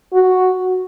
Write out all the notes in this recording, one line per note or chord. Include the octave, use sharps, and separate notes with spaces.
F#4